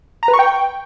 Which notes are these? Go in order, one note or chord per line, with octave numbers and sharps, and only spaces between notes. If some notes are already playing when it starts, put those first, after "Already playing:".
A#5
B4
C#6
G5